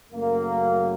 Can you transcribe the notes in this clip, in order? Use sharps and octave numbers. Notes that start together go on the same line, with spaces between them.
F#2 C#3 F#3 A3 A#3